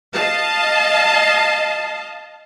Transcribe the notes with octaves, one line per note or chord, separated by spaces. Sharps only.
D#5 F5 A5